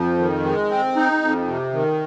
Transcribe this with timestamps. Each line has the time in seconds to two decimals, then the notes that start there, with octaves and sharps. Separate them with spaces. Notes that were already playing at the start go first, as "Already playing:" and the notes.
Already playing: F2 F3
0.18 D#3
0.44 G#3
0.71 C4
0.96 D#4
1.22 F2
1.47 C3
1.73 D#3